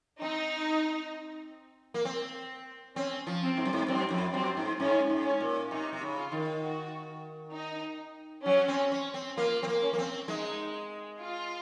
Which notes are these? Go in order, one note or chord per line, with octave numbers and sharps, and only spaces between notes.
C4 D#4
A#3
C4
C4 C#4
F3
C4
G#2
F#2
G#2
F#2 C4
F2
F#2 C4
G#2
G#2 C#4
G#2
C#4
A#2
C3 D#4
C3
C#3
F4
D#3
F#4
D#4
F#3 C#4
C4
C#4
C4
A#3 F4
C4
A#3
C#4
A#3
C4
G#3 D#4
F4